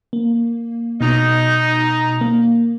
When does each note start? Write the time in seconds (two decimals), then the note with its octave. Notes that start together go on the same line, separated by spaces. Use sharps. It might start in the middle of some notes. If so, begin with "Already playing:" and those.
0.13 A#3
1.01 B2 D#4
2.21 A#3